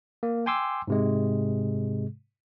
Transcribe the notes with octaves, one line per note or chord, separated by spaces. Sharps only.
A#3
G5 G#5 C6 D6 E6
G#2 C3 G#3